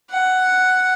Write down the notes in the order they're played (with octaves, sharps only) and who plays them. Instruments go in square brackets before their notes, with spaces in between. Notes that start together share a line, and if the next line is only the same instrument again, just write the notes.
[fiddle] F#5